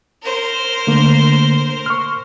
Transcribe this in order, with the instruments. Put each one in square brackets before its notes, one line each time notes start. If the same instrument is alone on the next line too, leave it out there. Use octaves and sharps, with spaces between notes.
[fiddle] A#4 C5
[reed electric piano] D3 A3 A#3
C#6 F6